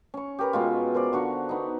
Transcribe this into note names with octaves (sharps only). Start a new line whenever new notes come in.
C#4 C#6
G4 A#4 B4
B2 G#3 F4
A#4 C5 D5
D3 F#4 C#6
B3 D#4